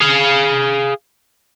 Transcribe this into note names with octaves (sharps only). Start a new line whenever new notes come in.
G#4 F5